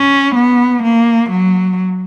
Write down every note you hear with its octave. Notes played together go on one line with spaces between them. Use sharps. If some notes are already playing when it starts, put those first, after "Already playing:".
Already playing: C#4
B3
A#3
F#3